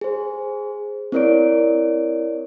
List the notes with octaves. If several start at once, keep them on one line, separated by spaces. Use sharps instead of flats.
G#4 C5
C4 E4 A#4 C#5 D5 D7